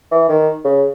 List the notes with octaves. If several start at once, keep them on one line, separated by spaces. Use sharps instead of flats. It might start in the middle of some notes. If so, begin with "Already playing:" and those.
E3
D#3
C#3